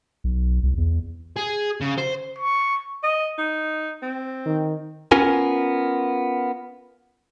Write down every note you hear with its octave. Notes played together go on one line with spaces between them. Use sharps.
B1
C2
E2
G#4
C#3
C5
C#6
D#5
D#4
C4
D#3
B3 C#4 F4 A#4 G#5